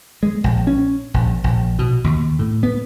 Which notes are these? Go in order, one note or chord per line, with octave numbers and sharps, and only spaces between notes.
G#3
A#1
C#4
A#1
A#1
B2
D#2
A2
B3